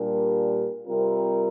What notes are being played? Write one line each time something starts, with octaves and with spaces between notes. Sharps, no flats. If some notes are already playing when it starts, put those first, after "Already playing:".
Already playing: A#2 G3 D4 G4 A#4
C3 G3 C4 F4 A#4